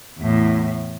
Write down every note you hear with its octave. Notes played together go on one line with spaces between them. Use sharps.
E2 A2